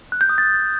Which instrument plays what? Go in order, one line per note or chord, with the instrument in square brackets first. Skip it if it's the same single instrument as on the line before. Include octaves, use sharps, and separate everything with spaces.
[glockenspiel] F#6
G6
D#6
A6